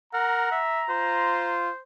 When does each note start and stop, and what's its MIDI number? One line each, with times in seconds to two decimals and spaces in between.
0.13 0.51 70
0.13 0.62 78
0.13 1.56 82
0.51 0.83 76
0.89 1.70 65
0.89 1.79 72